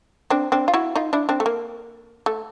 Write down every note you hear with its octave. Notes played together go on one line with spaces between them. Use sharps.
C4 D4
C4 D4
F4
E4 F#4
D#4 F4
D4 E4
C4 D4
A3
A#3
A3